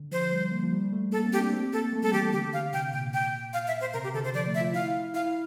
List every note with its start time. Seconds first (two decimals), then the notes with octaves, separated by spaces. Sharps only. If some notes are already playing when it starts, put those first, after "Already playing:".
Already playing: D3
0.11 F3 C5
0.32 G3
0.51 A#3
0.63 F3
0.73 G3
0.93 A3
1.12 A#3 A4
1.26 C4
1.33 G4
1.39 D4
1.53 C4
1.73 A#3 A4
1.93 A3
2.02 G3 A4
2.13 E3 G4
2.33 D3 G4
2.53 F5
2.73 C3 G5
2.93 A#2 G5
3.14 G5
3.53 F5
3.67 E5
3.81 C5
3.93 C3 A#4
4.04 G4
4.14 D3 A4
4.24 C5
4.34 F3 D5
4.47 A3
4.55 E5
4.61 F4
4.74 E4 F5
5.14 E4 F5